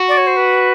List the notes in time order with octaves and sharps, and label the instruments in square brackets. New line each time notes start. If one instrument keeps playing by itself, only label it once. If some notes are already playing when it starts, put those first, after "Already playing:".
Already playing: [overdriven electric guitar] F#4
[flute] D5
C#5
C5
B4